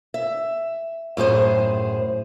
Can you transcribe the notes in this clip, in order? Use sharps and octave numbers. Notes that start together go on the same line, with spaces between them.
E5
F#2 A2 G#4 C5